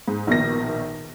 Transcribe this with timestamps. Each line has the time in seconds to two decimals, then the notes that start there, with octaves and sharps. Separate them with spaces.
0.08 G#2
0.27 A#1 B2 D#3 A#6